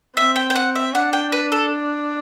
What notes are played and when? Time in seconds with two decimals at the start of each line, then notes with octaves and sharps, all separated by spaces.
0.17 C4 E5
0.36 G5
0.50 G5
0.56 F#5
0.75 E5
0.94 D4 F#5
1.13 G5
1.32 B4
1.52 A4